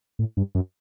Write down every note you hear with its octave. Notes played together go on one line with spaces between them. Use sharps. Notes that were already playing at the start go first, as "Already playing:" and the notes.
A2
G2
F#2